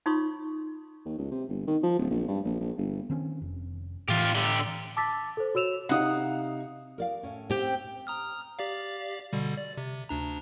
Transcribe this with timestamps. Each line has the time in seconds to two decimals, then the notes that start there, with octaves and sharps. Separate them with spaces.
0.06 D#4 F4 C#5 C6 C#6 D#6
1.05 D#2
1.18 C#2
1.31 C3
1.49 G1
1.67 D#3
1.83 F3
1.98 D1
2.11 A#1
2.28 G2
2.45 A#1
2.60 A#1
2.77 G1
3.10 D#3 C4 C#4
3.42 F1
4.08 A2 E3 F4 G4
4.35 D3 G4
4.97 A5 D6 E6 A6 B6
5.37 A4 C5
5.55 F#4 C#5 E6 E7 F7
5.89 C3 D#4 F5 F#5 D#6
6.98 A#4 D5 F5
7.23 A2 C#4
7.50 C4 G4 G5
8.07 A#5 D#6 F6
8.59 G4 D5 F5
9.33 B2 D3 G3
9.57 D5
9.77 C3
10.09 D2 D4 A#5